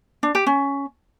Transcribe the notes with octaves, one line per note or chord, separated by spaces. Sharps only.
D4
G4
C#4